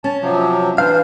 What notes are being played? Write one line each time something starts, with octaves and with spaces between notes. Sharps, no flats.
C#4 A5
C3 F3 F#3
E3 D4 B4 C5 F5